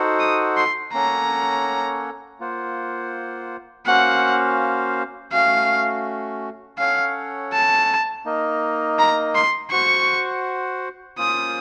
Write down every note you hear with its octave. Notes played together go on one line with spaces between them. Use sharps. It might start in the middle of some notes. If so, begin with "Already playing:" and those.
Already playing: D#4 F#4 A4 C5 F#5
D#6
C6
A#3 C#4 A4 C#5 F#5 A#5
A#3 F4 C5 F#5
A#3 C#4 F#4 C5 F5 F#5
A3 C#4 F#4 F5
C#4 A4 C#5 F5 F#5
A5
A#3 D#4 A#4 D#5
A#5
C6
F#4 C5 F#5 C#6
A#3 C#4 F4 C5 D#6